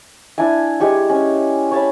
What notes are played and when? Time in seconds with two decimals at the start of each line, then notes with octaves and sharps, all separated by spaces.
0.38 D4 E4 E5 G#5
0.80 G#3 G4 G#5 C#6
1.10 C#4
1.71 C#5 A5 B5